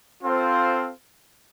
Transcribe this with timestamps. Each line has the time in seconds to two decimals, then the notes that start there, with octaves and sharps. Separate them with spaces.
0.22 C4 F4 A4 C5 F5